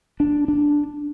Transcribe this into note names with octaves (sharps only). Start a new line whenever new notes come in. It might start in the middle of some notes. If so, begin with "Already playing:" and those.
D4
D4